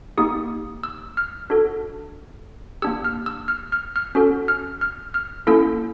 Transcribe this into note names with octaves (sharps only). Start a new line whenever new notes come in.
A#3 D#4 G4 D#6
E6
F6
D4 F#4 A4
A#3 D4 G4 E6
F6
E6
F6
F6
F6
C#4 F#4 A4
F6
F6
F6
A#3 C#4 E4 A4 E6